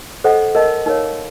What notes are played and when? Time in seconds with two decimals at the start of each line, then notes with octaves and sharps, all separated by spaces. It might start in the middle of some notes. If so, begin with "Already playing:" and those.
0.24 A4 C5 D#5 F#5
0.55 A#4 D#5 A5
0.86 D#4 A#4 C#5 F5